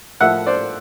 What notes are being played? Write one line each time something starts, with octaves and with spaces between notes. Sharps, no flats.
A2 F3 A#3 E5 F#5
C5 D5